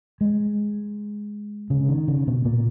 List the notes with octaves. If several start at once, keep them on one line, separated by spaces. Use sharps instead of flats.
G#3
C#3
D#3
C#3
B2
A#2